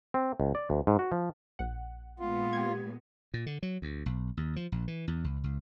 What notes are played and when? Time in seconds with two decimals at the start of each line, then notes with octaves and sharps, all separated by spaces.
0.14 C4
0.40 C#2
0.55 D5
0.70 D2
0.87 G#2
0.99 F#4
1.12 F3
1.59 A#1 F#5
2.20 A#2 G#3 B3 F4
2.53 G4 G#6
3.34 A#2
3.46 D3
3.63 F#3
3.82 D2
4.06 B1
4.37 D#2
4.56 F3
4.72 A#1
4.88 E3
5.08 E2
5.24 C#2
5.44 C#2